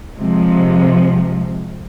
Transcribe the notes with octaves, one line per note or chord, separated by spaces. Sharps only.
C3 F3 G#3